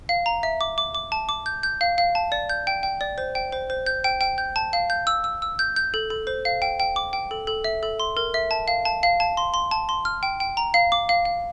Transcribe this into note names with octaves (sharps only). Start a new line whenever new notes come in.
F5
A#5
E5
D6
D6
D6
A5
D6
G6
G6
F5
F5
A5
D5
G6
G5
G5
D5
C5
G5
C5
C5
G6
G5
G5
G6
A5
F5
G6
E6
E6
E6
G6
G6
A4
A4
C5
F5
G5
G5
D6
G5
A4
A4
E5
A4
C6
A#4
E5
A5
F5
A5
F5
A5
C6
C6
A5
C6
F6
G5
G5
A#5
F5
D6
F5
F5